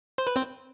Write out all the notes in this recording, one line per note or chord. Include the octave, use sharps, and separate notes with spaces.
C5
B4
C4 C5